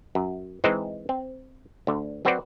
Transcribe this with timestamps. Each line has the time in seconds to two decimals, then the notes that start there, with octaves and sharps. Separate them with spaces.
0.15 F#2
0.64 E3 G#3 C4 D#4 C5
1.09 C4
1.87 D2 D3
2.25 F#3 C4 F#4 B4 C5 D5